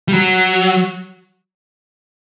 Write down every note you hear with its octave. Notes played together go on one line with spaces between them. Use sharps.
G3
F#3